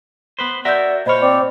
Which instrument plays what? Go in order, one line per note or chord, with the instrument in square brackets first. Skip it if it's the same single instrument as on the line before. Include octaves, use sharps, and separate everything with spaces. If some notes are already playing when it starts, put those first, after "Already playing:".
[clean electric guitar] B3 B4 C5
[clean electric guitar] F#4 A#4 E5 [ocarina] D5 [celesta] F#5 E6 G6
[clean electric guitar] A#2 C#5 [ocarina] C5 [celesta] D#5 B5 F6
[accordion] C4 D5